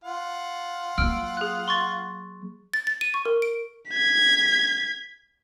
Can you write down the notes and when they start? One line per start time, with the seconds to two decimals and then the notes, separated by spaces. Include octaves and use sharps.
0.04 F4 F#5
0.98 F#3 A#3 E6 F6 D7
1.37 G#4 F#6
1.68 C6 C#6 A6
2.74 A6
2.87 A6
3.01 D#7
3.14 C#6
3.25 A#4
3.42 D7
3.90 G#6 B6